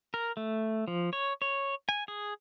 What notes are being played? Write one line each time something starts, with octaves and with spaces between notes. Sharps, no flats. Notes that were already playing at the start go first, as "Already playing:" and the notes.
A#4
A3
F3
C#5
C#5
G#5
G#4